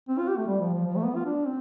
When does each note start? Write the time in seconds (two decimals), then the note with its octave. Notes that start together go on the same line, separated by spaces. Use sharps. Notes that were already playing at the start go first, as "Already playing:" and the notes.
0.09 C4
0.18 F4
0.28 G4
0.37 A3
0.47 G3
0.61 F3
0.74 F3
0.87 F3
0.96 A3
1.06 B3
1.16 F4
1.25 D4
1.45 C4